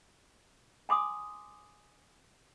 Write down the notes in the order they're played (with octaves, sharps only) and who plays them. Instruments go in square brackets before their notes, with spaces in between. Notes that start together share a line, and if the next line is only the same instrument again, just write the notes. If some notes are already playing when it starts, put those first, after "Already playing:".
[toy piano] G#5 C6 D6 D#6